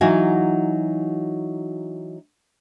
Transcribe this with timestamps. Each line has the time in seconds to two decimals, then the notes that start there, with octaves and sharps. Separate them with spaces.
0.01 E3 F#3 D#4 F#4 F5 G#5